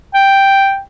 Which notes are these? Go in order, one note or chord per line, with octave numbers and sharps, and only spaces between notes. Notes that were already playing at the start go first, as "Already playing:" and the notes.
G5